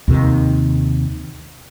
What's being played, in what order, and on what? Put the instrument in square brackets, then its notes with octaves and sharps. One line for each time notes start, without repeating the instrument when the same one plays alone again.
[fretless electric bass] D#2 C3 D#3